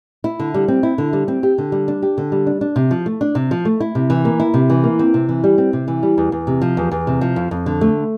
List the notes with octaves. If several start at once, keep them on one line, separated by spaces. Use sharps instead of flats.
E4
D3
G3
C4
E4
D3
G3
C4
G4
D3
G3
D4
G4
D3
G3
D4
D4
C3
F3
A3
D4
C3
F3
A3
E4
C3
E3
A#3
E4
C3
E3
A#3
C4
C3
E3
G3
C4
C3
E3
G3
E2
E2
C3
F3
E2
E2
C3
F3
F2
F2
D3
A3